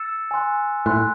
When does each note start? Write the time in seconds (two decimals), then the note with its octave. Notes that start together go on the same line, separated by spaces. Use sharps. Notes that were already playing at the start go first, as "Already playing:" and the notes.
Already playing: E6 A6 C#7 E7
0.31 G#5 C6 F#6
0.86 A2 G#5 C6 F#6